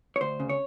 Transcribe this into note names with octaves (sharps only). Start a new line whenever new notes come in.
C#5
D2 C5
C#3
C#5